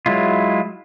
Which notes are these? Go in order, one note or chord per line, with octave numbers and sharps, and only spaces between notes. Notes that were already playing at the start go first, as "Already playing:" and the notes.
F#3 G#3 E4 F4